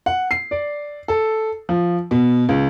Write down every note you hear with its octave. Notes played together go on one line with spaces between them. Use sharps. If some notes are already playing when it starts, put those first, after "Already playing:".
F#5
C7
D5
A4
F3
B2
C#2